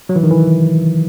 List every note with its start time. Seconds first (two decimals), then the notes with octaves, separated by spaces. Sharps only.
0.09 F#3
0.16 E3
0.23 D#3
0.31 E3